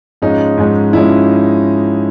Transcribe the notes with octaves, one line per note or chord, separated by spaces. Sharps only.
G#2 F3 G#3 C#4 D#4
G#2 F3 G#3 C#4
G#2 F3 G#3 C#4 E4